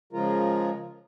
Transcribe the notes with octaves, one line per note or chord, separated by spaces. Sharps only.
C#3 F3 G#3 F4 A#4